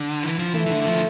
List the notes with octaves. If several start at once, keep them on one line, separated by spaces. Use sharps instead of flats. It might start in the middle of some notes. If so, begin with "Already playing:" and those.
Already playing: D3
E3
F3
E3 A3
E3
D3
F3
D3